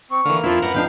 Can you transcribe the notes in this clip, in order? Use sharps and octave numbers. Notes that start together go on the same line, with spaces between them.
C4 C#6
D3 E3 A#3 F6
F2 F3 D4 E4 F4
F#2 A#4 B4 F#5
F3 C4 D4 D#4 F5 G5